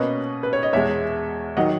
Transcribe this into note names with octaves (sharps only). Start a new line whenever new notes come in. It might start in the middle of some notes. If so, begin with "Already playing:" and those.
Already playing: B2 A#3 C#4 B4 D#5
B4
C#5
D#5
E2 B2 G#3 C#5 E5
D#3 F#3 D#5 F#5